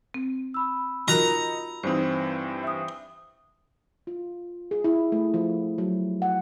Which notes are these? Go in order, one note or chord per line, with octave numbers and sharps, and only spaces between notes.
C4
B5 E6
D#4 F4 F#4 A#4 A#5
G2 E3 C4 D#4 C5
E5 D#6
F4
G#4
E4
A3
F3
F#3
F#5